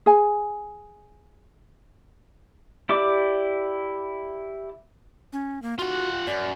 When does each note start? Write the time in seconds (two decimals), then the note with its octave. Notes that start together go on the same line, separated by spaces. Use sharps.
0.06 G#4 G#5
2.89 E4 G4 D5 D6
5.33 C#4
5.62 A#3
5.79 F4 F#4 F#5
6.27 F#2 D5